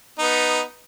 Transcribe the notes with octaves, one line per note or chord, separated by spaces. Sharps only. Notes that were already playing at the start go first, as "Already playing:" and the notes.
B3 D#4